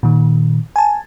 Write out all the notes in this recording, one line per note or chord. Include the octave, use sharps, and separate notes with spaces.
A#2 D#3
G#5 A5